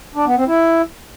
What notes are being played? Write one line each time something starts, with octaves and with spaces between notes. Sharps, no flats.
D4
B3
C4
E4